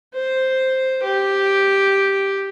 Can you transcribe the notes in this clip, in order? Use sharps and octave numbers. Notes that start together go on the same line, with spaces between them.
C5
G4